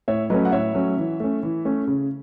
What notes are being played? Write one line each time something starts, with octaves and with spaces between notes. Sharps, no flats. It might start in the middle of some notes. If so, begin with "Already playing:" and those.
A2 C#5 E5
F#3 A3 C#4 B4 D#5
F#5
A2 C#5 E5
F#3 A3 C#4
E3
A3 C#4
E3
A3 C#4
C#3